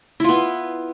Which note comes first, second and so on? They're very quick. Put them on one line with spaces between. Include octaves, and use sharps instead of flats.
E4 F4 B3